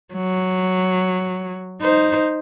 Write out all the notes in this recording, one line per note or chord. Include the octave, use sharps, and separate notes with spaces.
F#3
D#4 C5